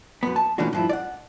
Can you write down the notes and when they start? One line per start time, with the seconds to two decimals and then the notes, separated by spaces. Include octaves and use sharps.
0.23 F#2 B3
0.36 A5
0.58 A#2 E3 A3 C#4 D4 F#4
0.73 G2 F3 E4
0.89 D5 F#5